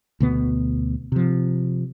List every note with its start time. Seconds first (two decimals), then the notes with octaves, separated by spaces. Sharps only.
0.20 D2 B2 B3
1.12 C3 F3